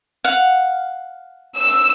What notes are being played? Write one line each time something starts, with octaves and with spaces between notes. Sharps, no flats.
F5 F#5
E6